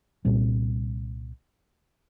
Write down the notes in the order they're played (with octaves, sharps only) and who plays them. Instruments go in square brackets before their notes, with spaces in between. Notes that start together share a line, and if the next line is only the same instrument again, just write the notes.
[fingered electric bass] C2 A#2 G3 C4